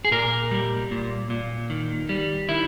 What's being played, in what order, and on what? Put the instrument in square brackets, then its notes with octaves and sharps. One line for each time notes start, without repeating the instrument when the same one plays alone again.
[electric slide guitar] G#4
A#2 A#4
G3
A#2
A#2
D#3
G3
D#3 E4